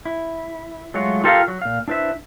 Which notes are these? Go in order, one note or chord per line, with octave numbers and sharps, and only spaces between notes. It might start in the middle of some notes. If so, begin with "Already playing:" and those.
E4
F#3 G#3 A3 F4 F#4 C#5
F4 G4 A4 A#4 D#5 F5
F#3
A#2 F5
D4 E4 B4 C5 E5